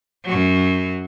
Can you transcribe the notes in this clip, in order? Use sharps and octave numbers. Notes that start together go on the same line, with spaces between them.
F#2 F#3